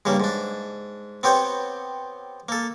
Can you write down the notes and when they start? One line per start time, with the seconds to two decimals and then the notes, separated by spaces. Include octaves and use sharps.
0.05 G2 C#3 G3 A#3
0.20 G#2 D4
1.23 B3 C4 G4 C#5 G5
2.49 A#3 A4